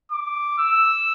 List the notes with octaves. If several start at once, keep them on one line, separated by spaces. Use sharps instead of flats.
D6
E6